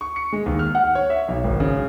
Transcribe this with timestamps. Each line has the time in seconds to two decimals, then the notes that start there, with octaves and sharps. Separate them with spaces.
0.01 C#6
0.16 C#7
0.33 G#3
0.46 D#2
0.59 F6
0.75 F#5
0.95 C#5
1.10 E5
1.28 B1
1.44 G#1
1.60 C#3